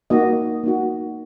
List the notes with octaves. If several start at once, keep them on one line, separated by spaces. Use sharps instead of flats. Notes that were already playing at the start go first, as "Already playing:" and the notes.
A#3 D#4 F#4 D#5
A#3 D#4 F#4